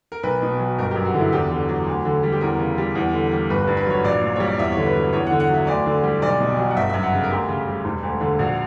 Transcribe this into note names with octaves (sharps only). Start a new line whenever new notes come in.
A#4
B1 B4
B2
F#3
G1 A#4
F#2 G4
F#4
D3
E4
E2 G4
D3
F#3
D2
D3
G3
G4
E2 A#4
C#3
G3
E2
D3
G3
G1 B4
G2 B4
B4
F#3 C#5
A#1 D5
A#2
G3 C#5
D5
E2 E5
D3 C#5
B4
F#3
E2 C#5
F#5
D3
F#5
F#3 E5
D2 D5
D3
G3
B1 D5
B2
F#3
F#5
G1 E5
F#2 E5
F#5
C#3
A#4
D2 G4
C#3
G3
E1
D2
D3
A#1 F#4